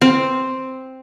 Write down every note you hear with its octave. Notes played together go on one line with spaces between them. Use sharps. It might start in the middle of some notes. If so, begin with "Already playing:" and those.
C4